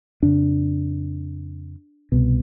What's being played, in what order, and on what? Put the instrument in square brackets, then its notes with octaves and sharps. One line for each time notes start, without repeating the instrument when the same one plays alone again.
[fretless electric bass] F2 C#3 D4
C2 B2